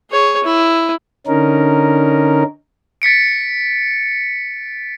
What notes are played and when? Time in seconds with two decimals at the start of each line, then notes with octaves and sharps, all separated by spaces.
0.11 G#4 C#5
0.44 E4
1.27 D3 C#4 D#4 A#4
3.02 A6 B6 C#7 D7